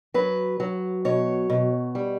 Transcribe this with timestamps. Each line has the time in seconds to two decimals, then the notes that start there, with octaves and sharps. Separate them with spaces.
0.14 F#3 B4
0.60 F#3
1.05 B2 C#5
1.50 B2
1.95 G3